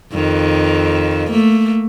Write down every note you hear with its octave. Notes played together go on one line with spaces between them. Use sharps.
F2 D#3
A3 A#3